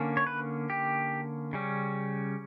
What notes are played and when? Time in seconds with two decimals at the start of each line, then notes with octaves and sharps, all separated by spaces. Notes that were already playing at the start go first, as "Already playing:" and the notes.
Already playing: D3 A#3 C#4
0.17 C#5
0.27 B4
0.70 G4
1.53 C#3 G3 C#4